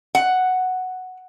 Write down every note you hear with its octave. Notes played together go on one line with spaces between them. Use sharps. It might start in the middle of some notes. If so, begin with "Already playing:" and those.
F#5